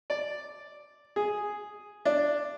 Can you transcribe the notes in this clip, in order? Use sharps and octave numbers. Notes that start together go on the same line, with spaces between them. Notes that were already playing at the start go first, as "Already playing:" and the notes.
D5
G#4
D4